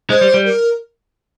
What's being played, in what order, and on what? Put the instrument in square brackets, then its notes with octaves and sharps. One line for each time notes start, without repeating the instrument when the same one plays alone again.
[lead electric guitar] G#3 [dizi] C5
[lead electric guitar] G3
G3
[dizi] A#4